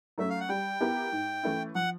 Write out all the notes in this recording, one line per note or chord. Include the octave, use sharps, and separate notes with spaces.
F#3 A3 C#4 E5
F5
F#5
G3 G5
B3 E4 G4 A#4
G#2
E3 A3 C#4 E4
F3 F#5